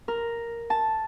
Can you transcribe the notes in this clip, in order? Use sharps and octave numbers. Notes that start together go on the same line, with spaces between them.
A#4
A5